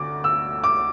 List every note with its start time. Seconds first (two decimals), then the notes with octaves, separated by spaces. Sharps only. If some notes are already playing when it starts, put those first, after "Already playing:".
Already playing: D2 D6
0.24 E6
0.64 D6